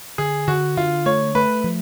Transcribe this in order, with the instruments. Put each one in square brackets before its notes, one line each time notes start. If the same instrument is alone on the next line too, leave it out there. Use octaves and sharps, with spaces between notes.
[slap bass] D3 [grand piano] G#4
[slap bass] D3 [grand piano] F#4
[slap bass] D3 [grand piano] F4
[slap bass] A3 [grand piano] C#5
[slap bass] A3 [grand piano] B4
[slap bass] F3